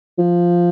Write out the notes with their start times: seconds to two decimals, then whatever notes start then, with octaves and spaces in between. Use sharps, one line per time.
0.18 F3